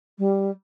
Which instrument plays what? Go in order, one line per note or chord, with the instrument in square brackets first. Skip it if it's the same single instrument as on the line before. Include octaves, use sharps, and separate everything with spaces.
[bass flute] G3